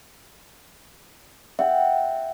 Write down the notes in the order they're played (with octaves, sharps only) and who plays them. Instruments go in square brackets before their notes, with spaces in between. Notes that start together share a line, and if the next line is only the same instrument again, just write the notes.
[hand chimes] E5 [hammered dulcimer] F#5 G5